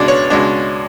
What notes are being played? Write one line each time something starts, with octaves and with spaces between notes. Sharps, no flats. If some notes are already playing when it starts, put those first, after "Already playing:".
Already playing: C#2 B2 G#3 D4 D5
C#5
C#2 B2 G#3 D4